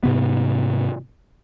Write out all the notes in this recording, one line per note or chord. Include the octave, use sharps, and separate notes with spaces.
G#2 C3 B3